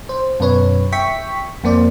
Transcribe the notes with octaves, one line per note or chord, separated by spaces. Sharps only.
C5
F#2 B2 B4 C#5
E5 G5 C#6 B6
F2 A#3 C5 D5